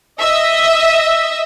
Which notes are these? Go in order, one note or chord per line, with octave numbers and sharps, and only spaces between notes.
D#5 E5